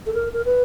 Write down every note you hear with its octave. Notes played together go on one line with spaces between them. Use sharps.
A4
A#4
A#4
B4